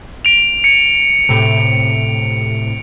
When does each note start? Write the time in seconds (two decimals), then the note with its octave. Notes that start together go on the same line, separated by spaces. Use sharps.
0.25 D7 F7
0.64 C#7
1.29 A2 C3